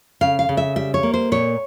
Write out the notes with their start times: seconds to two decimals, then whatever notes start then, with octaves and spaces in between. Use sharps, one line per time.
0.21 C#3 F5
0.39 F5
0.49 C#3
0.57 E5
0.76 G3 E5
0.94 C#5
1.03 A#3
1.14 C5
1.32 A#2 C#5